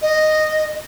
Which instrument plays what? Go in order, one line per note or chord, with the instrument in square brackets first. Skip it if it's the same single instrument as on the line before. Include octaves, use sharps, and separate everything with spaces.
[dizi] D#5